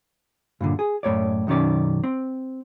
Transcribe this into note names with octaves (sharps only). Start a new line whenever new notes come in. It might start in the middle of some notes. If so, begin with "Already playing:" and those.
G2 A#2 D3
G#4
F#2 A2 C#5 D5
B1 F#2 D#3 C#4 D5
C4